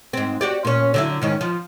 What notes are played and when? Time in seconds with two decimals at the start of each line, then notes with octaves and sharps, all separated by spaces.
0.13 G#2 C4
0.41 F#4 G4 D5
0.65 A#2 C#4
0.94 D3 F#3 E4
1.22 G#2 D#3 C#4
1.41 F3